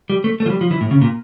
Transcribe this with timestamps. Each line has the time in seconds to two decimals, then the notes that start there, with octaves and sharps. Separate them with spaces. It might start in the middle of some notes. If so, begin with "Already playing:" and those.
0.10 G3
0.24 A3
0.40 A3
0.46 F3
0.50 G3
0.61 F3
0.71 E3
0.81 A2
0.91 C#3
1.01 A#2